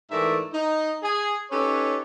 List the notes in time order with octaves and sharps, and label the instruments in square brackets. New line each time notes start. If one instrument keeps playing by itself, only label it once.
[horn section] G#2 E3 A3 A#4 D5 E5
D#4
G#4
C#4 D#4 G4 A4 B4 C#5